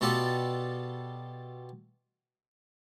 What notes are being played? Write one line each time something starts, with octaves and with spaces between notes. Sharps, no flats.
B2 B3 F4 G4 A4 D5